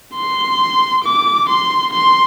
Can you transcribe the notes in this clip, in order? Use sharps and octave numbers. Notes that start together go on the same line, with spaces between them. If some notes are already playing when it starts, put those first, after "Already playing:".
C6
D6
C6
C6